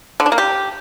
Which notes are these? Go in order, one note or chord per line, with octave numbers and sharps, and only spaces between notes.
D3
D4
A#3
G4